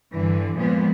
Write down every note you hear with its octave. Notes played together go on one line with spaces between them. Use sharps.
G2 D3 E3
A#2 F3 G#3 B3